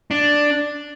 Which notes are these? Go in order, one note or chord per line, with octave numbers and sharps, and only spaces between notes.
D4